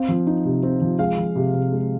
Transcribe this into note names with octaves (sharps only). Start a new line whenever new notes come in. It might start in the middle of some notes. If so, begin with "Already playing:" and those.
Already playing: C4 F5
F3
D#4
C3
C4
F3
G#3 F5
F3
C3
C3
G#3